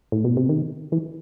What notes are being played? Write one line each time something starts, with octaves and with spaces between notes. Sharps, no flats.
A2
B2
C3
D#3
E3